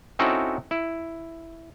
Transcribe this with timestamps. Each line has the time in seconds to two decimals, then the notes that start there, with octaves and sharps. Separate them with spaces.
0.19 C4 C#4 D#4 E4 F#4 A4
0.71 E4